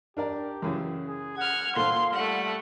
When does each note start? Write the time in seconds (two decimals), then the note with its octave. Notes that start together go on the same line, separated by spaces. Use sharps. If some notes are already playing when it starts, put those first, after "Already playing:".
0.17 D4 G4 A#4 D5
0.62 F#2 C#3 E3
1.08 G#4
1.37 F#5 F6 G#6
1.76 A#2 A4 C5 F5 C6
2.14 G3 A3 F#5